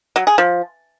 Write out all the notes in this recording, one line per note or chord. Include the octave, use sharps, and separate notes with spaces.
F#3
G#4
F3